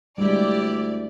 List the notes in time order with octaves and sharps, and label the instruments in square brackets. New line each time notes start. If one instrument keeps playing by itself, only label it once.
[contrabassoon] D2 [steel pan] G3 G#3 [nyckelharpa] E4 G4 [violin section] D5